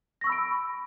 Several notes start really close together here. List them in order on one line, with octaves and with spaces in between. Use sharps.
A#6 C#6 E6 B5 D7